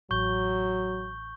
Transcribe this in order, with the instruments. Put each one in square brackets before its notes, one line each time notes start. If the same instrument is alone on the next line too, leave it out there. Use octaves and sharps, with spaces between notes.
[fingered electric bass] A1 [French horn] F#3 [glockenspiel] C#6 G6 G7